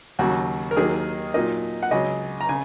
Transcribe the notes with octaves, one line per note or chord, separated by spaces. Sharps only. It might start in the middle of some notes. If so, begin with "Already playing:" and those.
D#2 C#3 F#3 F#4
A#4
D#2 D#3 F#3 A#3 G#4
A#2 F#3 A#3 D#4 D#5
F#5
C#2 C#3 F#3 D#5
A#5
C#3 G#5